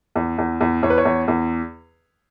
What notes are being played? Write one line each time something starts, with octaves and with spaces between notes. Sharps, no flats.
E2
E2
E2
E2 C#5
B4
C#5
E2
E2